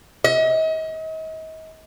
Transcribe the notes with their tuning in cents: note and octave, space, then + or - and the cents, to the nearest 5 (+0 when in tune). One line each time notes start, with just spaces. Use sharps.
D#5 +40